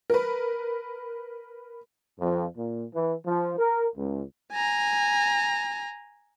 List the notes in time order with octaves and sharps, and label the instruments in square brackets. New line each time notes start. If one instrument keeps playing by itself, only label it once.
[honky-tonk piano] A#4 B4
[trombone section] F2
A#2
E3
F3
A#4
C#2
[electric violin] G#5 A#5